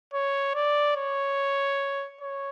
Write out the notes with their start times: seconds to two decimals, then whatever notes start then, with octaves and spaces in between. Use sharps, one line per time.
0.13 C#5
0.55 D5
0.96 C#5
2.21 C#5